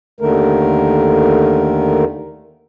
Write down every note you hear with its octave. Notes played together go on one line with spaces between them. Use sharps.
D#2 D3 D#3 A3 A#4